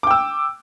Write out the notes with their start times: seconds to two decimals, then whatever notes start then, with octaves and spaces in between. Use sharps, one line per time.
0.03 D6
0.07 G5
0.11 E6